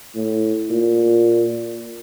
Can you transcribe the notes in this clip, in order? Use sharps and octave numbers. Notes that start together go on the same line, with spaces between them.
A2
A#2